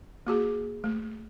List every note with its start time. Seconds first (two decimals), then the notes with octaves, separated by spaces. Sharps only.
0.27 A#3 F#4 G#4
0.84 A3